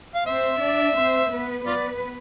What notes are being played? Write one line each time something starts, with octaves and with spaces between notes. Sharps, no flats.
F5
C4 C5 E5
D4 D5
C4 C5
B3 B4
B3 F4 B4 D5